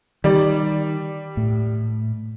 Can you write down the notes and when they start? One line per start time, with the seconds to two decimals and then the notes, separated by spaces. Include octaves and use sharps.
0.24 D#3 G3 D5
1.37 A2